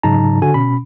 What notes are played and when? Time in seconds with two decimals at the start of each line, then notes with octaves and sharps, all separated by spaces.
0.03 G#2 C#3 F#3 D#4 A5 A#5
0.42 D3 F#4 G#5
0.54 B2 C#4 B5